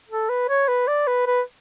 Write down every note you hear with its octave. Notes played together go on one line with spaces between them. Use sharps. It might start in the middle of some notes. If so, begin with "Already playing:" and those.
A4
B4
C#5
B4
D5
B4
B4